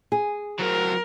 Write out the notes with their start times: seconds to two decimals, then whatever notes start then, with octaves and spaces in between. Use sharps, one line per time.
0.12 G#4
0.59 F#3 C4 A#4